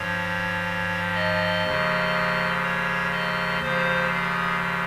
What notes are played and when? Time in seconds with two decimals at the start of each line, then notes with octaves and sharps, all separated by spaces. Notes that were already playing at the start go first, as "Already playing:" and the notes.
Already playing: G2 F3 C#5
1.15 D#5
1.64 D#2 C#3 F3
2.63 C#5
3.12 D#5
3.62 D#2 C#3 F3 C5
4.12 G#4